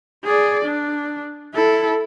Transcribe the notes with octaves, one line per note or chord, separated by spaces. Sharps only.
G#4 D5
D4
E4 A4